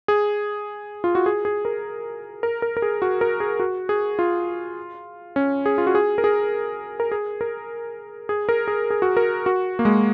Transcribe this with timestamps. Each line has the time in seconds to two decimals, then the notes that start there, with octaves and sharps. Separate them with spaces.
0.08 G#4
1.04 F4
1.15 F#4
1.26 G#4
1.45 G#4
1.65 A#4
2.43 A#4
2.62 A#4
2.77 A#4
2.82 G#4
3.02 F#4
3.21 A#4
3.40 G#4
3.60 F#4
3.89 G#4
4.19 F4
5.36 C#4
5.66 G#4
5.78 F4
5.87 F#4
5.95 G#4
6.18 A#4
6.24 G#4
7.00 A#4
7.12 G#4
7.41 A#4
8.29 G#4
8.49 A#4
8.68 G#4
8.90 G#4
9.02 F#4
9.17 A#4
9.46 F#4
9.79 A#3
9.85 G#3